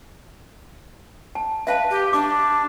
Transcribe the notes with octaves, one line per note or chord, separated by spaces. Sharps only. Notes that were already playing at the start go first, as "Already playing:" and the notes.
A5
B4 E5 F5 A5
G4
D4 D6